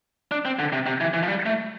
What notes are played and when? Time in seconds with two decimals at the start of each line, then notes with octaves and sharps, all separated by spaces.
0.32 D4
0.45 C4
0.59 D3
0.73 C3
0.86 C3
1.01 E3
1.14 E3
1.23 F3
1.28 G3
1.46 A3